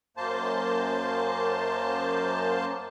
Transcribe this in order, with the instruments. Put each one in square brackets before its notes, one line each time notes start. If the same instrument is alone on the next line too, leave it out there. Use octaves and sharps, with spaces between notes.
[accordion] F#2 A#3 C5 A5